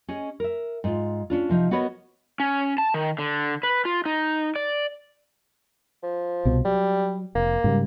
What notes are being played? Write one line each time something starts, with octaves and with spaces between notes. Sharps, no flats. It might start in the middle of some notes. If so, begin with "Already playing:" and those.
C#4 G#4 D#5
A#4 E5
G#2 F4
C#4 D4 F4
C3 F3 D#4
B3 F#4 A#4 B4 C#5 D#5
C#4
A5
D#3
D3
B4
F4
D#4
D5
F3
C2 B2
F#3 G3
F1 A#3
G#2 C#3 G3